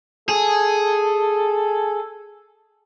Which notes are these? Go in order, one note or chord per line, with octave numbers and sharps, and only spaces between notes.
G#4 A4